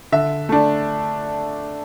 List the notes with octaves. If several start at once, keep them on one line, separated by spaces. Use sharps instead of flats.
D3 E5
A3 D4